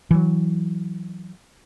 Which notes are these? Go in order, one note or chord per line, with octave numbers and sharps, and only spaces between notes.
E3 F#3